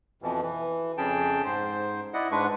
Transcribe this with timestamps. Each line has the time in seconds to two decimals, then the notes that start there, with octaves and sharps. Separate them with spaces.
0.22 F2 B2 E3 F3
0.42 E3
0.98 F2 C#3 C#4 G#4 G5 A5
1.44 G#2 C5
2.14 E4 D5 D#5 F#5
2.31 G#2 G#3 D4 B4 C#6